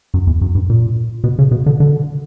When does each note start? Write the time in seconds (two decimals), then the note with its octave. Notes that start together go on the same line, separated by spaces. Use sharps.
0.14 F#2
0.27 E2
0.41 F#2
0.55 G2
0.70 A#2
1.24 B2
1.39 C#3
1.51 B2
1.66 D3
1.80 D3